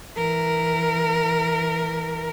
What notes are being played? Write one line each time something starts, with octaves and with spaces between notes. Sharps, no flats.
E3 A#4